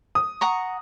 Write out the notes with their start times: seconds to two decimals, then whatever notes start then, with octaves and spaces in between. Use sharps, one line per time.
0.15 D#6
0.41 F#5 A#5 C#6